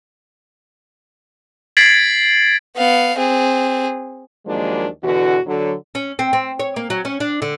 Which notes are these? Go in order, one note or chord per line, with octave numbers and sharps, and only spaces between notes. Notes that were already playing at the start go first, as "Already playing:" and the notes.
G#6 A6 B6 C7 D7 F#7
B3 F5
C4 G#4
D#2 F3 F#3 G#3 A#3 D4
E2 B2 D3 E3 F#4
D3 F#3
C#4
C4
C4
C#5
A#3
F#3
C#4
D4
D3